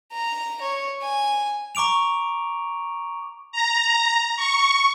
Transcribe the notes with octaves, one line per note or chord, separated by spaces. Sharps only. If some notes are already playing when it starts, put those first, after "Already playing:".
A#5
C#5
G#5
A#5 C#6 D6 D7 F7
A#5
C#6